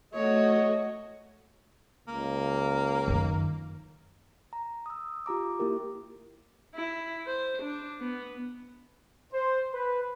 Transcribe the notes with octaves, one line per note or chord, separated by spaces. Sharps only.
A3 F#4 C#5 D#5
C#2 A#3
F#2 D#3
A#5
D#6 E6
F4 G4 A#5 D6
A#3 E4 G4 A#4
E4
C5
D4
B3
C5
B4